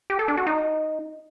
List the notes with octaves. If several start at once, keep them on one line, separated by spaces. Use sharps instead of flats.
G4
A4
D4
F#4
D#4